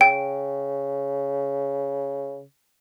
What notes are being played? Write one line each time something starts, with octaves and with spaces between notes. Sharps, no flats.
C#3 G5